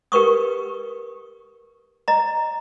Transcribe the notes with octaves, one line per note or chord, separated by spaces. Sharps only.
G4 A#4 B4 C#6 D#6
D#5 A#5